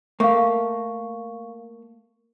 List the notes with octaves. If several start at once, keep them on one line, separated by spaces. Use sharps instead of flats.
A3 A#3 F5 C#6